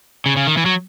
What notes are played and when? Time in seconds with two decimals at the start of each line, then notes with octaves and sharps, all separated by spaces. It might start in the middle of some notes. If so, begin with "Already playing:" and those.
0.26 C#3
0.37 C#3
0.47 D#3
0.57 E3
0.66 F#3